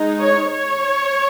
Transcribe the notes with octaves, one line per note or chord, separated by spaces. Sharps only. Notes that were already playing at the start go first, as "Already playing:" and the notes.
Already playing: G#3 D#4
C#5
C#5